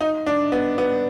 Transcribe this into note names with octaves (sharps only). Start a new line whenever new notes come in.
D#4
D4
B3
B3